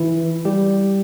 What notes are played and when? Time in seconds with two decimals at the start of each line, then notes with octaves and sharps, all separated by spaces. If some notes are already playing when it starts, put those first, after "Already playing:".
Already playing: E3 E4
0.45 G3 G4